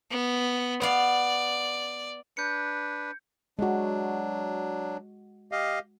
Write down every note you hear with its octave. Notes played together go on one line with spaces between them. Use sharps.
B3
B3 D5 F5
D4 B4 G6 C#7
F#3 G#3 D4 F#4
G4 D#5 F5